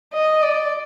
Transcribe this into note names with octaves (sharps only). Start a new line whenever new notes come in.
D#5
D5